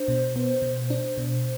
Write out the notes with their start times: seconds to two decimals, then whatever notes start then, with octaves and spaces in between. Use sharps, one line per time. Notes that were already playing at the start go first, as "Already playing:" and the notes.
Already playing: D4 C5
0.08 B2
0.36 B3
0.62 B2
0.90 D4
1.17 B2